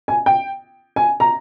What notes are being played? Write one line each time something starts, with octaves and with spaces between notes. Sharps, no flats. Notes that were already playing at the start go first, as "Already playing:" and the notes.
G#5
G5
G#5
A#5